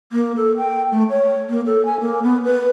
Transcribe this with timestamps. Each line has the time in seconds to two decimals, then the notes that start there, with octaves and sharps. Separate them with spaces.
0.12 A#3
0.37 A4
0.57 G5
0.92 A3
1.10 C#5
1.49 A#3
1.66 A4
1.85 G#5
2.00 A#3
2.23 B3
2.45 B4